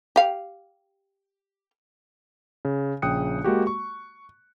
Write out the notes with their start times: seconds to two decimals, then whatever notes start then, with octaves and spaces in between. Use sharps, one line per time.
0.16 G4 F5
2.65 C#3
3.02 A#1 C#3 G5 D#6 F#6 C#7
3.44 G#3 A#3 F#4 G4
3.67 C#6